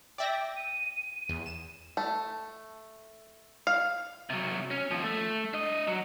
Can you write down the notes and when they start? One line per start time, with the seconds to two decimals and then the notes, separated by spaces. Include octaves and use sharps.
0.18 D5 E5 G5 A#6
0.56 D#7
1.29 E2
1.46 E7
1.97 A3
3.67 F5
4.30 C3 F#3
4.71 C#4
4.91 D#2 F3
5.04 A3
5.54 D4 D#5
5.87 F#3